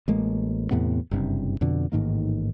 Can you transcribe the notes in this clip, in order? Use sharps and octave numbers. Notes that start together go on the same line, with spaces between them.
A1 G#3 A#3
E2 A2 C3 B3
F#1 G2 C3
F2 B2 D3
A1 G#2 D#3 A#3